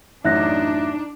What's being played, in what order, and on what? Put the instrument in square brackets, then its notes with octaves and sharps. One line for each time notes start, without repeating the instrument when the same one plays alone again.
[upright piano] A1 F#2 [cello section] D4 [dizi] D#4 [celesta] E5 F#6 A#6